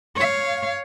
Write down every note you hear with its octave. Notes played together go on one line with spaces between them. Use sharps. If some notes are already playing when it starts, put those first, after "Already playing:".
C#5 F5